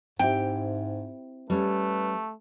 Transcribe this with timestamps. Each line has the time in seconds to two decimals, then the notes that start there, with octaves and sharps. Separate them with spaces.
0.19 G#2 C4 E4 G4 G5
1.50 G3 A3 C#4 B4